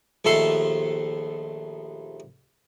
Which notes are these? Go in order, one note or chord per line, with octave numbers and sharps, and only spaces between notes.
A#1 D#2 A3 A4 C6